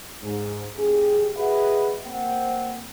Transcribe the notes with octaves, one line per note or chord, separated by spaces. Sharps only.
G#2
F#1 G4 G#4
F#4 G#4 B4 D#5 E5 F#5
A#3 C4 F#5